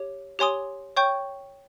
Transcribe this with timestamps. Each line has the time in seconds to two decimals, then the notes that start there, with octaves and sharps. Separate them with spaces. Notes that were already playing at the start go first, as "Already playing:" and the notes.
Already playing: G4 C#5
0.39 G4 C#5 G#5 C6 D#6
0.97 C#5 G5 C#6 G6